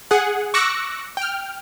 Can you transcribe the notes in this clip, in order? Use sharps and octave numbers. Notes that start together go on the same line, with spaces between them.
G#4 F#5
C#6 D6 E6 F#6 A#6 C#7
G5 F6